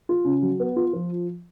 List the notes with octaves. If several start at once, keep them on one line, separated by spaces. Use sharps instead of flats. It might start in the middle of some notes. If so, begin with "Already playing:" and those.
F4
C#3
F#3
B3
F4
F3